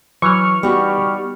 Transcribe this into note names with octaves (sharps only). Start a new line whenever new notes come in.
E3 F#3 C#6 F6
G3 B3 D#4 F#4